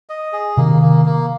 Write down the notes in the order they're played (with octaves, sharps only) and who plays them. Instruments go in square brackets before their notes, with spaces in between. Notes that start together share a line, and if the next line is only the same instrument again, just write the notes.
[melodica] D#5
G#4
[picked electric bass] C3 D#3 [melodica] A#3
[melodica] A#3
A#3